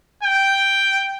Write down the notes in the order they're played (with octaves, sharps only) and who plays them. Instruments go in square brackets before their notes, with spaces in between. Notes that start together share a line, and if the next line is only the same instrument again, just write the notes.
[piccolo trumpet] G5